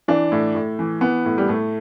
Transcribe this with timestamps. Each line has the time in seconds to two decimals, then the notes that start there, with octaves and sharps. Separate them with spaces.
0.08 E3 D4
0.32 A2
0.55 A2
0.79 E3
1.01 E3 B3
1.25 A2
1.38 G3
1.48 A2 A3